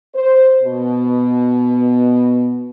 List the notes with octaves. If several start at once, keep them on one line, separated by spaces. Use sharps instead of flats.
C5
B2